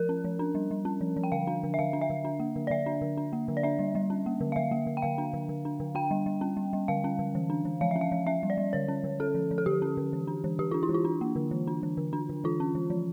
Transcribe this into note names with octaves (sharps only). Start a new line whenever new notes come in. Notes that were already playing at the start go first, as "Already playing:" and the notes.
Already playing: F3 A#4
C#4
F3
D4
G3
G3
C#4
F3
F3
G5
D3 F5
D4
D3
E5
D3 F5
D4
E5
D3
D4
A#3
D3
D5
D3 E5
D4
D3
D4
A#3
D3
D5
D4 E5
G3
G3
C#4
A#3
D3
F5
D3 E5
A#3
D3
G5
D3 F5
D4
D3
D3
D4
D3
D4 G5
G3
G3
C#4
G3
G3
D3 F5
C#4
D3
E3
D4
E3
F3 F5
C#4 E5
F5
F3
C#4 E5
G3
D5
G3
D3 C#5
C#4
D3
C#4 A4
F3
F3
A4
D3 G4
C#4
D3
E3
D4
E3
E3 G4
D4 F4
E4
E3
F4
D4
A#3
D3
E3
D4
E3
D3
D4
D3
E3 F4
C#4
E3
F3